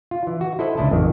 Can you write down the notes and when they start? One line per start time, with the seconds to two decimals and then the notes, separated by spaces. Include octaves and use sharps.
0.11 F4
0.27 E3
0.41 F#4
0.59 E4 A4 C5 D#5 F#5
0.77 C#2 D4 E4 D#5 A5
0.90 A1 F2 D#3